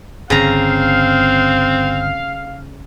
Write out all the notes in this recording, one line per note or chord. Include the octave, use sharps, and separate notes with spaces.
G1 C#3 C4 F5 A#5